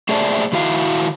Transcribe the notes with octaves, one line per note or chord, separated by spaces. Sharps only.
A3 G#4 C5 D5 E5 A5
D#3 E4 F#4 F5